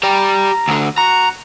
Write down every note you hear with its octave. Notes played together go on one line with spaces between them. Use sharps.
G4 D5 A#5
D2 D3
F#4 A#5